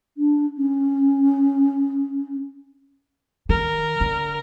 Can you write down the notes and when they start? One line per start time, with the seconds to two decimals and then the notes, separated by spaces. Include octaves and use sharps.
0.17 D4
0.57 C#4
3.49 D#3 A#4
4.01 D3